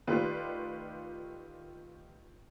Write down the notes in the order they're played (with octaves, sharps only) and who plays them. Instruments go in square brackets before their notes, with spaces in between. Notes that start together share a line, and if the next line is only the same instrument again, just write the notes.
[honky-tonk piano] D#3 A3 F4 G4 B4 D5